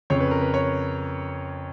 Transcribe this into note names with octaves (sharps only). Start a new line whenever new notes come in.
F2 C#3 C#5
B4
A#4
B4
C#5